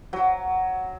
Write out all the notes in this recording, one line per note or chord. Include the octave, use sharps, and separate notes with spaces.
F#3